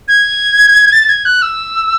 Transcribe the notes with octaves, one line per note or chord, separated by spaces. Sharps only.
G#6
A6
G#6
F#6
E6